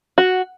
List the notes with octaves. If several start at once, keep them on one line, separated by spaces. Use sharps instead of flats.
F#4